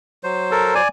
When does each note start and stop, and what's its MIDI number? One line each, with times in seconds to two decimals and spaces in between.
0.24 0.82 54
0.24 0.82 72
0.51 0.74 69
0.51 0.74 70
0.75 0.88 74
0.75 0.88 80